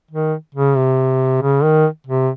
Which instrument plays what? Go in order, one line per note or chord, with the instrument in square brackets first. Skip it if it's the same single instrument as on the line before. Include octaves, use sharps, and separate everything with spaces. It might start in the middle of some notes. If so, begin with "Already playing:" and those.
[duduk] D#3
C#3
C3
C#3
D#3
C3